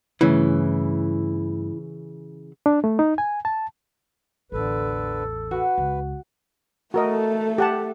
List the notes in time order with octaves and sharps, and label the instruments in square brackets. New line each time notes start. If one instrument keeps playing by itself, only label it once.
[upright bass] G2 A3 [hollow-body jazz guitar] C#3 E3 [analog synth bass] E4
[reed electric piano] D4
A3
D#4
G#5
A5
[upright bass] A1 E2 [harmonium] D3 B4 [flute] A4
[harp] F#4 [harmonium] B4
[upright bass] C#2
[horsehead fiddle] A3 A4 [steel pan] F#4 A#4 D#5
[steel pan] G4 F#5 A5